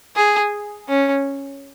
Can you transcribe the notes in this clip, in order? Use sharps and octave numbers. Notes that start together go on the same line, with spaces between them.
G#4
C#4